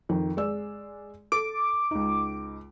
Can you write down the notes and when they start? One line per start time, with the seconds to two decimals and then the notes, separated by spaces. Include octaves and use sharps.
0.09 F2 D#3
0.37 G#3 D5 E6
1.32 A4 D6
1.91 C#2 D#4